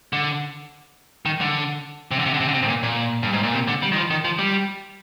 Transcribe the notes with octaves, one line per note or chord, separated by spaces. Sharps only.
D3
D#3
D3
C3
D3
C3
D3
C3
D3
C3
G#2
A#2
A#2
G2
G#2
A#2
C3
D3
G3
D#3
F3
D#3
F3
G3